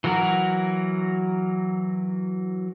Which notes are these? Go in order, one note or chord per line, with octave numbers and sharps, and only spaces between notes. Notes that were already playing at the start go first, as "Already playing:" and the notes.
E3 F#3 F#4 A#4